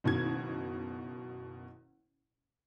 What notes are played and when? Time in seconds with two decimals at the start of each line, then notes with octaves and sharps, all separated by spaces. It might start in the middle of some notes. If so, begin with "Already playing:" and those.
0.04 F#1 B2 D#3 G#6